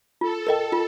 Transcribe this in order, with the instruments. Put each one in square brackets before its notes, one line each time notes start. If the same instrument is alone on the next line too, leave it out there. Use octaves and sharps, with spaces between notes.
[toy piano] F4 [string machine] A4
[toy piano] A#4 D#5 G5
F4